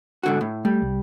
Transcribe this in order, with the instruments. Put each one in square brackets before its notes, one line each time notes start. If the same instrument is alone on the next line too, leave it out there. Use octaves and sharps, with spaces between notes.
[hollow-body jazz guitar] G#2 D3 F#4
A2
[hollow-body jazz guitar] G3 [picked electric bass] A3
[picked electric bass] C2